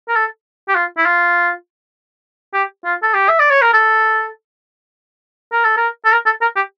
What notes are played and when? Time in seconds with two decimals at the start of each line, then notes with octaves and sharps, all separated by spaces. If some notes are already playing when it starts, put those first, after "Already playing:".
0.09 A#4
0.16 A4
0.69 G4
0.75 F4
0.98 E4
1.06 F4
2.54 G4
2.85 F4
3.03 A4
3.14 G4
3.29 E5
3.40 D5
3.51 C#5
3.62 A#4
3.73 A4
5.52 A#4
5.65 A4
5.77 A#4
6.05 A4
6.12 A#4
6.26 A4
6.41 A#4
6.56 G4